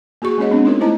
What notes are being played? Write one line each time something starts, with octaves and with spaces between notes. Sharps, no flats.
A#3 F#4 G#4 C#6
G#3 A#3 C#4 G#4 C#5 D#5
G#3 B3 C4 D4
C#4 D#4 F4 A#4 C#5
A3 E4 C5 D#5 A5 A#5